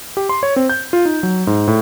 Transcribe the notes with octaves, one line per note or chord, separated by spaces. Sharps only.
G4
C6
C#5
C4
G6
F4
D#4
F#3
G#2
A2